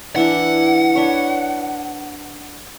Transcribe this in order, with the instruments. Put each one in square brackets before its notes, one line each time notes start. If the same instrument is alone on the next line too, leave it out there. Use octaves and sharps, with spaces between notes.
[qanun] E3 D4 E4 [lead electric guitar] F#5
[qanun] D4 B4 C#5